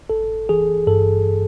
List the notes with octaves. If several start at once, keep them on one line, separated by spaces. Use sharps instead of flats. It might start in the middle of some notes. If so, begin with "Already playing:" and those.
G#1 A4
E3 G#4
G2 A4